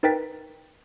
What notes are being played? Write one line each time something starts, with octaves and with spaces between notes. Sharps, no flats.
D#4 A#4 B4 G5 A6 B6